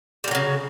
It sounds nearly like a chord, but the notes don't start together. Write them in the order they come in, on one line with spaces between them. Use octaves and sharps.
G3 A#2 F#3 C#3